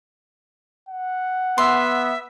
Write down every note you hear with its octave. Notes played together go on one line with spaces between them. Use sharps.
F#5
B3 E5 C6